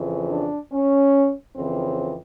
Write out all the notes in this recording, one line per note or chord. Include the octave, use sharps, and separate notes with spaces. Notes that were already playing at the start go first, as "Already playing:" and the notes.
Already playing: F2 C#3 E3
D4
C#4
F2 C#3 E3 C4